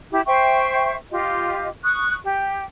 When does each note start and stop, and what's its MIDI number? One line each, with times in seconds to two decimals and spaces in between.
0.11 0.21 64
0.11 0.21 67
0.26 0.96 72
0.26 0.96 76
0.26 0.96 79
0.26 0.96 85
1.11 1.68 65
1.11 1.68 67
1.11 1.68 75
1.83 2.15 85
1.83 2.15 87
1.83 2.15 90
2.24 2.64 67